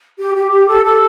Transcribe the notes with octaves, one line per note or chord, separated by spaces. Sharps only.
G4
G4
G4
A4
A4